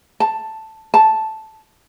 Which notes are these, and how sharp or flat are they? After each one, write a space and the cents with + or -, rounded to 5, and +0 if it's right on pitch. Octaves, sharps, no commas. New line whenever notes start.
A5 +5
A5 -5